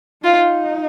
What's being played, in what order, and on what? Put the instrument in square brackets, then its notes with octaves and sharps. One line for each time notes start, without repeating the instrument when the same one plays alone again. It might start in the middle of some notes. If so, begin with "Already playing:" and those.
[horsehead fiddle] D#4 [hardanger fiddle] F4